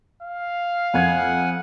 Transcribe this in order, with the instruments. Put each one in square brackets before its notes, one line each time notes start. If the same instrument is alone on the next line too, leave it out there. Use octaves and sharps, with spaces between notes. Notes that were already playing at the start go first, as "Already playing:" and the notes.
[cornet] F5
[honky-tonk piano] F2 G#6 [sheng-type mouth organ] F#5 G#5